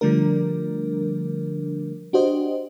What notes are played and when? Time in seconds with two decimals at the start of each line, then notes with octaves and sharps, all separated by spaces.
0.01 D3 F3 G3 A3 D4 A#4
2.13 D4 F#4 G4 C5 D#5